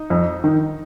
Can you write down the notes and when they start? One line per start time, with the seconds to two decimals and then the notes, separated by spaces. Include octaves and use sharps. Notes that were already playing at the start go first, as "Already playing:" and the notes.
Already playing: D#4
0.10 F2
0.44 D#3